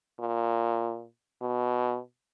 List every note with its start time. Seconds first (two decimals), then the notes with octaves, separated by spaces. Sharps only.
0.20 A#2
1.42 B2